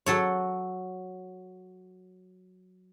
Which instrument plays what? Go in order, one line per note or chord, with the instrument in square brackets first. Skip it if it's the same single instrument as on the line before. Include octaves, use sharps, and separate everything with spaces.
[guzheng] F#3 A4 C#5